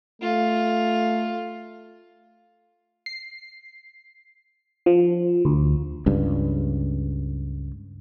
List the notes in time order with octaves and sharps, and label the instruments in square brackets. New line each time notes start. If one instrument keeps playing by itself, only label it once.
[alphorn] A3 [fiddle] F4
[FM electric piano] C7
F3
D2
[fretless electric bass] C#2 G2